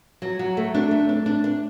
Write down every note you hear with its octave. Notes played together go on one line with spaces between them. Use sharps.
F#3
F#3
A3
D4
A3
D4
D4
D4